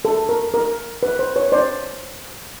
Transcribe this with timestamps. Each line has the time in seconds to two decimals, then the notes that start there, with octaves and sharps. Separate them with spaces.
0.05 A4
0.29 A#4
0.54 A#4
1.03 B4
1.19 C5
1.36 B4 C#5
1.52 C5 D5